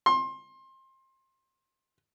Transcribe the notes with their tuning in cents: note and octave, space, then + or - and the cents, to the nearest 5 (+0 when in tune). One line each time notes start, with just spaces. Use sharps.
C6 +25